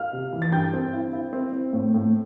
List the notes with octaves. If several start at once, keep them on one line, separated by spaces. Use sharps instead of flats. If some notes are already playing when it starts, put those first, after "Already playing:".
Already playing: F5 F6
C3
E3
A6
G2 G5 G6
C4
E4
E4
C4
C4
A2
A2